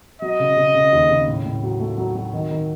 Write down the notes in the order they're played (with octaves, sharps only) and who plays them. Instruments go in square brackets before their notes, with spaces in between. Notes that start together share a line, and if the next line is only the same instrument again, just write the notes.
[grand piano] F#3 [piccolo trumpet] D#5
[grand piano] C#3
C#3
C#3
D#2
C#3
A2
A2
F#3
A3
F#3
F#3
D#3
D#3